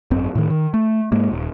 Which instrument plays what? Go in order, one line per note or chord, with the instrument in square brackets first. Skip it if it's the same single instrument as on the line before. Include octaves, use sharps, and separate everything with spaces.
[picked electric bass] G#1 F#2 C4
A2 D#3
D#3
A3
G#2 G#3 A#3
D#1